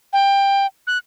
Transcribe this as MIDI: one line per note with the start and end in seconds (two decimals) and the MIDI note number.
0.13 0.66 79
0.87 0.98 90